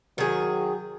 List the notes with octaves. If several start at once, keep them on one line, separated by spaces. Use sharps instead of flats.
D#3 F#3 G#4